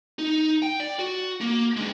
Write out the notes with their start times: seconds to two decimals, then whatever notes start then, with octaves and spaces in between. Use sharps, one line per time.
0.19 D#4
0.62 G5
0.80 D5
0.99 F#4
1.41 A#3
1.76 G#3 D4